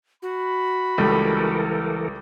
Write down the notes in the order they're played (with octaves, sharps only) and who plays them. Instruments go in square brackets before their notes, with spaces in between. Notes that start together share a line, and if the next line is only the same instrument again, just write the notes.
[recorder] F#4 [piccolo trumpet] B5
[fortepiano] C#2 G3 A3 [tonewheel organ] E3 A4 A#4